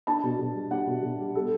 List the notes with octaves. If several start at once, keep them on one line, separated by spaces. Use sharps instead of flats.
D4 A5
B2
B2
G3
D4 F#5
B2
B2
G3
G3 A4